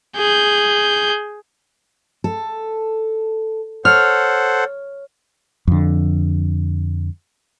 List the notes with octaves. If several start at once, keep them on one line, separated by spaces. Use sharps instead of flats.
G#4 G6
A4
A4 C5 C#5 F#5 F6
F2 D3